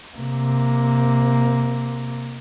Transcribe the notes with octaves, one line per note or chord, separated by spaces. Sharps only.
C3 A#3